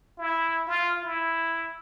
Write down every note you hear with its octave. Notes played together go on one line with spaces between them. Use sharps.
E4
F4
E4